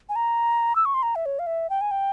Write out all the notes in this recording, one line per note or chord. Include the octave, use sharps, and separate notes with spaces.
G#5
A#5
E6
C#6
C6
A#5
E5
C#5
F5
E5
G5
G#5
G5